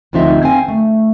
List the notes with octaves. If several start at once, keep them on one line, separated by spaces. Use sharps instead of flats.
D2 C3 F3 C4 D#4 E5
C4 F5 G#5
A3